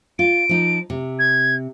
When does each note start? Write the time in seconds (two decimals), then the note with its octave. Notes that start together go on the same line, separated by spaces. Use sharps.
0.19 F4 D7
0.49 F3 D#4
0.90 C3
1.19 G#6